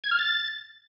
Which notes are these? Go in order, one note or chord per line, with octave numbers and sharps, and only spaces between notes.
G#6
F6
A6